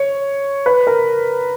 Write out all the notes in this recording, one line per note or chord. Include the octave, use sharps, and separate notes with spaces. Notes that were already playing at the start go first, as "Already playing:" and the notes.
Already playing: C#5
B4
A#4